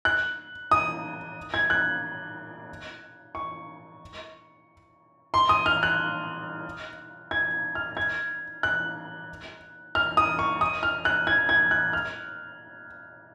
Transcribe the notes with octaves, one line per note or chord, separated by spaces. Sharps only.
F#6
D#6
G#6
F#6
C#6
C6
D#6
F6
F#6
G#6
F6
G#6
F#6
F6
D#6
C#6
D#6
F6
F#6
G#6
G#6
F#6
F6